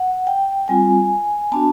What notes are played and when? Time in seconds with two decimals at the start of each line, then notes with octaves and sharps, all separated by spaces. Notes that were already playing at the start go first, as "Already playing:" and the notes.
Already playing: F#5
0.27 G5
0.68 G3 C4 F4 G#5
1.52 B3 D4 F#4 A5